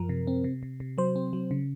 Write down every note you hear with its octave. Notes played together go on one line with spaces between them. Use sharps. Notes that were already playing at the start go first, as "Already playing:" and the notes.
Already playing: F#2 F3 A#4
C3
C4
C3
C3
C3
F#3 C5
C4
F#3
C#3